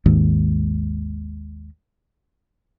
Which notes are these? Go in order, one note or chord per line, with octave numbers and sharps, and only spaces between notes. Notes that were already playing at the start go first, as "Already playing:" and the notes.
G#1 D#2 G#2